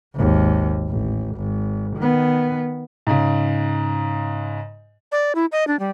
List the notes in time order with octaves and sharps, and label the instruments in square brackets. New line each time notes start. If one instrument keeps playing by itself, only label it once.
[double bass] G#1 D#2
A1
G#1
D#3 B3
[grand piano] G#2 C#3
[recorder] D5
E4
D#5
D4
G3